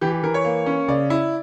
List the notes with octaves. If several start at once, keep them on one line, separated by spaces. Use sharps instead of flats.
E3 G4
G4
E3 A#4
C#5
A#3
C#4
C#3 D5
E4